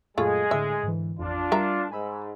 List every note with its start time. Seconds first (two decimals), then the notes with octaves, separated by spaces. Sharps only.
0.18 F#2 A#2 F#3 G#3 A3 F4 G#4
0.51 A2 D3 E5
0.83 G#2 D3 E3
1.19 A1 F2 D4 F4
1.52 G3 A#4 E5 A#5
1.91 G#2 G#5 B5 E6